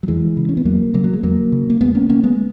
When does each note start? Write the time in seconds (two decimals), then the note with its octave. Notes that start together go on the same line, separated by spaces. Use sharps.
0.03 F#3
0.07 E2 E3 G#3
0.37 C#3
0.49 C#4
0.57 B3
0.65 E2 F#3 A#3
0.94 C#3 F#3 A#3
1.04 F#3
1.13 G#3
1.23 E2 F#3 A#3
1.52 C#3
1.70 A#3
1.81 E2 G#3 B3
1.95 A#3 C#4
2.09 C#3 A#3 C#4
2.23 G#3 B3